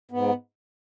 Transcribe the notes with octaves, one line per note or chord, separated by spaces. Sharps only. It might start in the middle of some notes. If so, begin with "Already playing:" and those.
G#2 B3